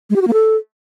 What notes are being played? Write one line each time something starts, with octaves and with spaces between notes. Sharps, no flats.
G#3
G4
F#4
A#3
A4